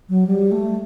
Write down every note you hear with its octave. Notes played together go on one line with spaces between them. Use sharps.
F#3
G3
A3